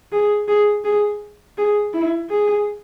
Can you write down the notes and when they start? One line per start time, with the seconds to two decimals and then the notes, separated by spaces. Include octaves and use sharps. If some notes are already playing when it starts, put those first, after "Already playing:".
0.12 G#4
0.48 G#4
0.84 G#4
1.58 G#4
1.94 E4
2.30 G#4